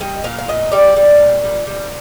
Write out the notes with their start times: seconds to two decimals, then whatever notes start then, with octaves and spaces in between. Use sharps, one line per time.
0.01 G3 D#5
0.24 A#2 F5
0.39 F5
0.48 A#2 D#5
0.72 G3 D5
0.96 G3
1.20 A#2
1.44 G3
1.67 G3